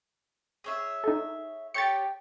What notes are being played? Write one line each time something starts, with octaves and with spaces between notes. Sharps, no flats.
G#4 C#5 E5
D#4 A4
G4 C#5 G5 A6 C#7